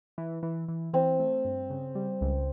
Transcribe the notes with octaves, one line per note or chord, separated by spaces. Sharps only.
E3
E3
E3
E3 C4
A3
G2
C#3
G3
C#2